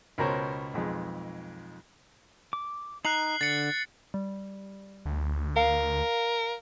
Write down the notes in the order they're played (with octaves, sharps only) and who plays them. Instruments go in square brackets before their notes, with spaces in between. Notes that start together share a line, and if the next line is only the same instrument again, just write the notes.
[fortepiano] C#2 B2 A#4 C5 C#5
B1 F2 G#3
[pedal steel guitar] D6
[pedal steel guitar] D#4 A#5 [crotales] F#6 C7 F#7
[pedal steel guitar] D3 [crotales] A6 C#7
[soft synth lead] G3
[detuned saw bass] D2
[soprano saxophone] A#4 [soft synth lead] F5